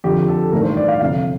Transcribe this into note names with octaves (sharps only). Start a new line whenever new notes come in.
F2 D3 F3 G4
A4
A1 G2 D#3 A#4
C5
D5
F5
G1 F2 C3 F5